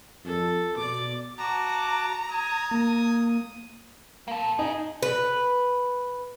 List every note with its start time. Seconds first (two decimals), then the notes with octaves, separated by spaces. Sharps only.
0.25 F2 A4
0.76 B2 D5 D6
1.38 F#4 A5 A#5 D6
2.31 G#5 D#6
2.71 A#3
4.28 A#3 A4
4.59 D#4 F4 G#4
5.03 B4